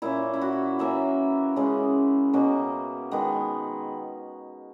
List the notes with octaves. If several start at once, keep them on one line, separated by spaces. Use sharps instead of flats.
A#2 A#3 C#4 E4
E4
F#4
E3 A#3 C#4 E5
C#3 G#3 C#4
B2 A#3 C#4
D#3 G#3 B3